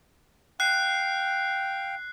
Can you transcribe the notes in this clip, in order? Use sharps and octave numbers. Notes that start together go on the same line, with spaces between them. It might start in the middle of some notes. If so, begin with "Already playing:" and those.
F5 G5 F#6 C7